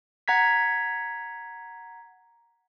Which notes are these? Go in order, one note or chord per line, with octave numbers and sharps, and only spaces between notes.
F#5 A#5 G#6 B6